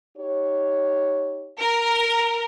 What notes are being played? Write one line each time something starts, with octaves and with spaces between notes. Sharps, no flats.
D#4 G4 C#5
A#4